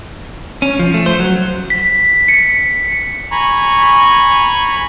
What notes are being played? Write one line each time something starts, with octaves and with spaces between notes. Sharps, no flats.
C#4
F3
A3
C5
F#3
B6
C#7
G#5 A#5 B5 C#6